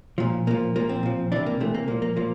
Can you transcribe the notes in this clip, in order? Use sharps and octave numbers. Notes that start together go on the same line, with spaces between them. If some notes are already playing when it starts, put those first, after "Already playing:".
A#2 F3
A#2 F3 A#3
A#2 F3 A#3
C4
A#2 F3
C3 E3 D4
A#3
C3 E3 A3
A#3
A#2 F3 A#3
A#3
A#2 F3 A#3